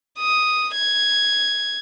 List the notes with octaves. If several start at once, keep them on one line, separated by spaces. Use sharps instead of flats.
D#6
G#6